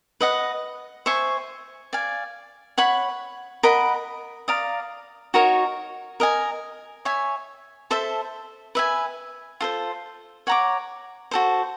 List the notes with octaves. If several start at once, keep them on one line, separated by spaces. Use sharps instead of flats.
B4 D#5 F#5
C5 E5 G#5 C#6
D5 F5 G#5
C#5 F#5 B5
A#4 D#5 F#5 B5
D5 F5 A#5 D#6
D#4 F#4 A#4 C#5
A#4 D#5 G#5
C#5 E5 G#5
A4 C5 E5 A5
B4 E5 G#5
F4 A4 C5
C#5 F#5 A#5 D6
F#4 A4 C5